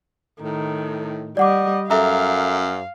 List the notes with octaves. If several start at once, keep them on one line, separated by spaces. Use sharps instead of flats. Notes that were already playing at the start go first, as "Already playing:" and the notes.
A2 D#3
G3 D5 D#5 F#5 D6
F#2 A4 E5 F5 A#5